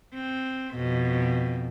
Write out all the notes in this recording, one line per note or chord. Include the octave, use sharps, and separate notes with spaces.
C4
F2 B2